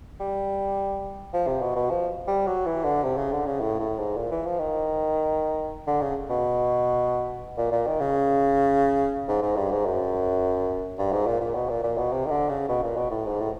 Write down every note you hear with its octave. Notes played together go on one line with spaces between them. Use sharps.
G3
F3
C3
B2
B2
F3
G3
F#3
E3
D3
C3
C#3
D3
C#3
A2
A2
G#2
A#2
E3
F3
D#3
D3
C#3
B2
A#2
A#2
D#3
C#3
G#2
G#2
G2
G#2
F#2
G2
G#2
A#2
A#2
B2
A#2
A#2
B2
C3
D#3
D3
C#3
B2
A#2
B2
A2
G#2
A2